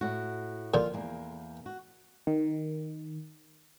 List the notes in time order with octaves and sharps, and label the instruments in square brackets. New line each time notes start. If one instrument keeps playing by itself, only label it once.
[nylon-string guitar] A2 F#4
[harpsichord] A#2 D3 F3 [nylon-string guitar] F4
[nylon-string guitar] E2 A#3
F#4
[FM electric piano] D#3